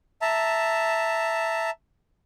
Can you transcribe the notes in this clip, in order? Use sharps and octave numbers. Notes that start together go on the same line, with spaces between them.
E5 A5 A#5